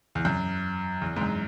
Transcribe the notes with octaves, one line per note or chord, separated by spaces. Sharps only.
E2
F#2
E2
G#2
F#2